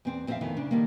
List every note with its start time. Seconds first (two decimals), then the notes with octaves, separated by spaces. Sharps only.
0.05 E2 C4 D5
0.27 F2 C4 C#4 G4 E5 F5
0.41 F2 D#3 E3 A3 B3
0.57 C#3 D4
0.71 D3 D#3 G3 A#3